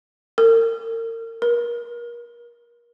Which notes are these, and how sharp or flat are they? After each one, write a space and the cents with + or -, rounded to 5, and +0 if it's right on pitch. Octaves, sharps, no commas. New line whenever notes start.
A#4 -35
A#4 +35